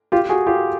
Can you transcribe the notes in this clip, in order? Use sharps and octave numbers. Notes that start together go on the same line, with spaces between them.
F4 G4
F#4 G#4
F4 G4